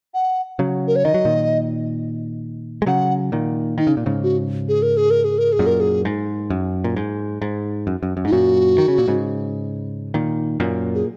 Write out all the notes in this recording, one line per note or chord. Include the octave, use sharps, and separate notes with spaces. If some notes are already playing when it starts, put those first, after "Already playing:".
F#5
C#3 F#3
A#4
C#5
D#3 D#5
F#3
A#2 D#3
G#3
C#3 F#3 F#5
A#2 D#3
D#3 D#4
C#3
A#2
G#2 C#3
F#4
G#4
A#4
G#4
A#4
G#4
A#4
G#4
F#2 A#2
A#4
G#4
G#2
F#2
A#2
G#2
G#2
F#2
F#2
F#2
G#2 D#4
F#2 A#2 F#4
D#3
C#3
A#2
G#2 C#3
A#2 D#3
F#2 A#2
G#4